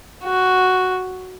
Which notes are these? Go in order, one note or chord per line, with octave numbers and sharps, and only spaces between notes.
F#4